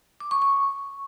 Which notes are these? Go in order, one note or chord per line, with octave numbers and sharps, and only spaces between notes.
D6
C#6
C#6